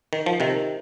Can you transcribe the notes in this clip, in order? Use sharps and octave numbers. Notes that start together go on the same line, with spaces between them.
D#3
F3
C3 D#3